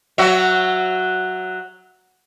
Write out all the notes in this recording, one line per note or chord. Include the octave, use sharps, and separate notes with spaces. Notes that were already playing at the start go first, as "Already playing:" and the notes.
F#3 F#4 E5